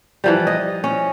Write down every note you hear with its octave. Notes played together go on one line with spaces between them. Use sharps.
E3 F3 G3
D#5
C#4